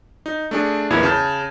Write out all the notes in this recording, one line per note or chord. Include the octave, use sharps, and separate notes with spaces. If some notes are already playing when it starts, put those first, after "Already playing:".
D#4
A3 D4 G#4
B1 E2 A#2 B3 E4 G#6
C#3 A5 G6